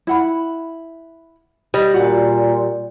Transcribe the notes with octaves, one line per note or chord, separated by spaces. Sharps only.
E4 F#5 B5
G3 D#5
A#2 F#4 F5